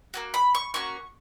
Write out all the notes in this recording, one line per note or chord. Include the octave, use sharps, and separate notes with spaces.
A#3 C#4 F#4
B5
C#6
A#3 C#4 F#4 C#6